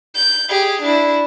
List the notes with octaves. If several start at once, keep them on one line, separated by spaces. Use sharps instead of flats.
G6
G4 G#4
D4 E4